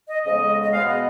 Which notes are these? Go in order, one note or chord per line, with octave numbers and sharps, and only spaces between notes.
D#5
F2 C#3 G#3 B3 D#5
D#5
B2 G#3 B3 F5
D#5